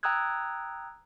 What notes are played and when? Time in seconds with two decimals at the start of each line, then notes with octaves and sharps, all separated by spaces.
0.03 G5 A#5 D#6 E6 F#6 G#6